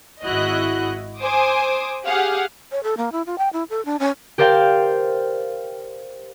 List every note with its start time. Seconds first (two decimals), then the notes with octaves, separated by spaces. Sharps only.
0.25 G#1 E4 F#4 D#5 F#6
1.20 C5 G#5 C6 D6 D#6
2.07 G4 G#4 F5 F#5
2.72 C#5
2.83 A4
2.97 A#3
3.12 E4
3.26 F4
3.38 G5
3.53 E4
3.70 A4
3.85 D4
4.00 C#4
4.38 G4 A#4 C5 D5 F5 G5